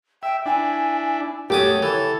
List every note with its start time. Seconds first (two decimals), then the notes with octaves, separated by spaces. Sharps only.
0.23 E5 G5
0.46 D4 E4 G#5
1.50 F#2 A3 G4 C#5 D6 D#6
1.82 E3 A4